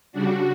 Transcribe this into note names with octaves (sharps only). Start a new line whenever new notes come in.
C#3 G3 D4 F#4